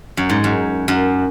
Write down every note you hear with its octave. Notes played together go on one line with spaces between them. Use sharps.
F#2
G#2
F#2
F#2